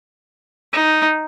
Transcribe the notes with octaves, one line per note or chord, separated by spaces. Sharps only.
D#4